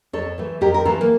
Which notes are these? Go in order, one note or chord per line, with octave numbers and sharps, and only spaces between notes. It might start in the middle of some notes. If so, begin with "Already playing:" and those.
F2 A4 C#5
E3 A3
F2 G4 A#4
A#4
E3 A3 F4 A4
A#3